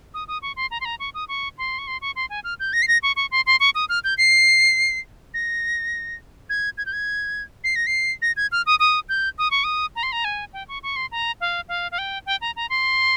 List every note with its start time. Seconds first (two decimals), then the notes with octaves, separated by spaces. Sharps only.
0.14 D#6
0.28 D#6
0.42 C#6
0.56 C6
0.71 A#5
0.80 C6
0.85 A#5
0.99 C#6
1.14 D#6
1.28 C#6
1.58 C6
1.78 C#6
1.87 C6
2.01 C#6
2.16 C6
2.30 G#5
2.44 F6
2.60 G6
2.73 A#6
2.82 C7
2.88 A#6
3.03 C#6
3.16 C#6
3.31 C6
3.46 C6
3.60 C#6
3.75 D#6
3.89 F6
4.04 G6
4.18 C7
5.34 A#6
6.50 G#6
6.78 G#6
6.86 G6
6.93 G#6
7.64 C7
7.76 A#6
7.87 C7
8.22 A#6
8.36 G#6
8.52 F6
8.66 D#6
8.79 D#6
9.09 G6
9.38 D#6
9.51 C#6
9.64 D#6
9.96 A#5
10.03 C6
10.12 A#5
10.24 G#5
10.53 G5
10.68 C#6
10.83 C#6
10.96 C6
11.11 A#5
11.41 F5
11.68 F5
11.91 F5
11.98 G5
12.26 G5
12.41 A#5
12.56 A#5
12.70 C6